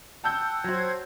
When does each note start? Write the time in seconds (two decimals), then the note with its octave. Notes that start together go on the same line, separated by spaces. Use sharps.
0.24 F#5 G5 A5 E6 G6
0.64 F#3 F#4 C5 G#6